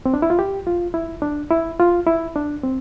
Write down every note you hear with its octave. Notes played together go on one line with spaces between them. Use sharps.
C4
D4
E4
F4
G4
F4
E4
D4
E4
F4
E4
D4
C4